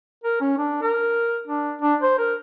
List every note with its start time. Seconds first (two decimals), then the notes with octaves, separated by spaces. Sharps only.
0.24 A#4
0.41 C#4
0.58 D4
0.82 A#4
1.47 D4
1.82 D4
2.02 C5
2.19 A#4